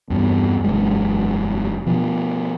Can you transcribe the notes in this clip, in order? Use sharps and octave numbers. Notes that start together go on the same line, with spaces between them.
E2 G2 B3
E1 F#2 G#3
B2 F3